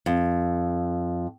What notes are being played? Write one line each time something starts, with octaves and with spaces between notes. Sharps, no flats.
F2